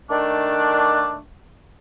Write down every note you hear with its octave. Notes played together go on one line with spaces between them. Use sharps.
D#3 A3 D4